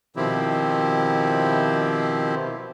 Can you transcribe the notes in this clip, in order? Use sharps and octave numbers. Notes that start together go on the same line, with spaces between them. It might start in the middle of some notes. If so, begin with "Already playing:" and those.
B2 D#3 F3 C4 E4 G4